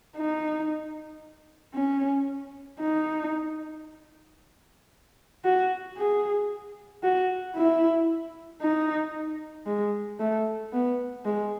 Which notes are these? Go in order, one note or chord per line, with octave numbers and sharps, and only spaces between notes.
D#4
C#4
D#4
F#4
G#4
F#4
E4
D#4
G#3
A3
B3
G#3